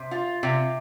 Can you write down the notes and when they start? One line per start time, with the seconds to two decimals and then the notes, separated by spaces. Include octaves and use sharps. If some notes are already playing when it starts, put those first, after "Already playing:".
Already playing: C3
0.11 F4
0.43 C3